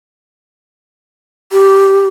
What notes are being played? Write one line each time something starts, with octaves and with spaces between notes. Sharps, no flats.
G4